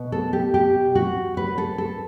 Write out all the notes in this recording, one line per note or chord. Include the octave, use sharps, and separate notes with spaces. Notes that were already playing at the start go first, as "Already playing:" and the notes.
Already playing: B2
A4
G4
G4
F#4
B4
A4
A4